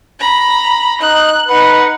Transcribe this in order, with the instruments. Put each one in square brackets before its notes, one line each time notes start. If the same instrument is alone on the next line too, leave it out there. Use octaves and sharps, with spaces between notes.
[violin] A#5 B5
[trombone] D#4 [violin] F#6
[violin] D#4 F#5 [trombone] B4